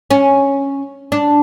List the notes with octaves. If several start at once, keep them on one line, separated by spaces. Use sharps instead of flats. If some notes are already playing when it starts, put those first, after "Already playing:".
C#4
D4